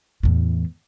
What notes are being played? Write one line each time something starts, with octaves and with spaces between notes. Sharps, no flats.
E2 A2